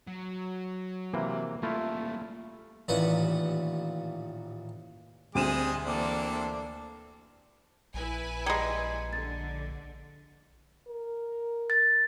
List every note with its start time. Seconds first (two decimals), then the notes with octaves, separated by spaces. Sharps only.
0.08 F#3
1.13 C3 E3 A#3
1.63 G3 A3 A#3 E4 F4
2.88 A1 D#2 A#2 B4 F#5 C#6
5.35 D2 G3 G#3 C4 D#6 D#7 E7
5.86 E3 A#3 C4 D4 A4 D5
7.94 A#1 E4 B4 G#5
8.46 G3 G#3 A#5 G#6 C#7
9.13 D3 A6
10.87 A#4
11.70 A6